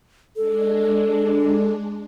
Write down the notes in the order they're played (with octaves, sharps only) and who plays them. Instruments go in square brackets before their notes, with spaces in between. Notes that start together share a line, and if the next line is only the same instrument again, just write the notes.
[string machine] G#3 D4 [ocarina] A4